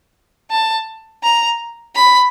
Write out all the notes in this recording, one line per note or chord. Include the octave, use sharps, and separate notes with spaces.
A5
A#5
B5